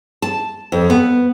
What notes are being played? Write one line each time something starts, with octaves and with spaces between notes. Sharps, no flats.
A5
F2
B3